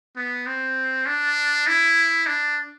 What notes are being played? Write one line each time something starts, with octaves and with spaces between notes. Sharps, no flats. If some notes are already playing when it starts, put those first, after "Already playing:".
B3
C4
D4
E4
D4